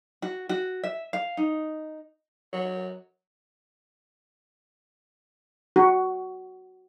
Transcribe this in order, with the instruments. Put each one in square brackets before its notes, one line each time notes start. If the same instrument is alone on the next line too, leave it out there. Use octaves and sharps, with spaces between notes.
[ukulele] F#4
F#4
E5
F5
D#4
[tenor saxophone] F#3
[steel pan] F#4